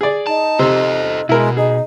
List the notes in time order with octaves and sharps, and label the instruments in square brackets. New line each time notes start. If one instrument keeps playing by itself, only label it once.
[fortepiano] G#4 D5
[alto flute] D#4 [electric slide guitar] A5
[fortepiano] C3 [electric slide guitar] A4 C5
[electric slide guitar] B2 [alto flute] G#3 [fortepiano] E4 A#4
[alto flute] D#4 [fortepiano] G#4